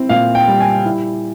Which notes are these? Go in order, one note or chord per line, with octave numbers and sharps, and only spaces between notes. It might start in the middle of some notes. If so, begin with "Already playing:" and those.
Already playing: C4 E4
A#2 F5
G5
G3
G#5
E4